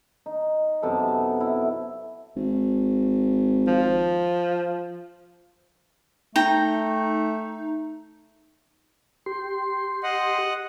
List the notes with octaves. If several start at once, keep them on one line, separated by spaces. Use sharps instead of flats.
D#4
F#2 C3 B3 A4
A5
E4
G#1
F3
A3 D#4 G5 A#5
G4 C6
D#5 F#5